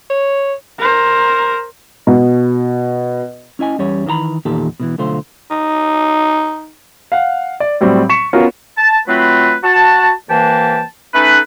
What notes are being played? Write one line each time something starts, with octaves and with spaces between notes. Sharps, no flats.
C#5
A#4 C5
B2
C#4 E4 D#5 G#5
E2 G3 C#4 C#5
D#3 E3 G4 A#5 B5
E2 A#2 D#3 D#4 G4 A4
B2 D#3 E3
B1 D3 A3 F4 C5
D#4
F5 F#5
D5
A2 F#3 G3 C4
C#6 B6 C#7 E7
B3 C#4 F4 F#4 A#4
A5
F#3 A3 C4 F4 B4
F#4 A5
C2 E3 A#3 B4 G5 A5
A3 C#4 D#4 A4 B4